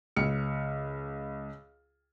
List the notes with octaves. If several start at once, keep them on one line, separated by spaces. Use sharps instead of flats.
C#2 F6 C#7